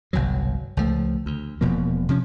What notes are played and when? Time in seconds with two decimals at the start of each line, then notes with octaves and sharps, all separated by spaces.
0.13 G1 C2 B2 F#3
0.77 C#2 F3 A3
1.26 D2
1.61 E1 B2 F3 A#3
2.09 C3 F3 C#4